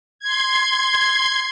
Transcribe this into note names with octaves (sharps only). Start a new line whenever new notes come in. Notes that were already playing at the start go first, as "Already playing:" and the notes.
C6 G#6